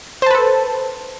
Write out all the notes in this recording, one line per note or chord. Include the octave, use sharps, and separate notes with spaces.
A4 B4 C5 A5